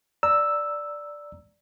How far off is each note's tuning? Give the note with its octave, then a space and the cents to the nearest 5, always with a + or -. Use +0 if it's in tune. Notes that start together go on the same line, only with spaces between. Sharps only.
D5 +0 A#5 +0 E6 +0